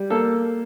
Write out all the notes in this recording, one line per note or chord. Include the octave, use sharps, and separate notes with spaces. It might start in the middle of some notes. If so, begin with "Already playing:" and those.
Already playing: G3
A#3 A4